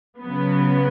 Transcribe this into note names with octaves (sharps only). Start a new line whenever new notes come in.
C#3 F#3 B3